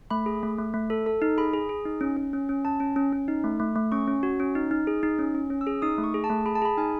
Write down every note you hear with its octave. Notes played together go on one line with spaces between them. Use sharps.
A3 B5
G#4
A3
A3
A3
A4
A4
D#4
G#4 B5
G#4
G#4
D#4
C#4
C#4
C#4
C#4
C#4 A5
C#4
C#4
C#4
D#4
A3
A3
A3
C#4 C#6
C#4
F#4
C#4
D#4
D#4
G#4
D#4
C#4
C#4
C#4
E6
G#4
D#4 D#6
A3
C#6
G#4
A5
A3
G#4 B5
A5
G#4 B5
D#4 G#5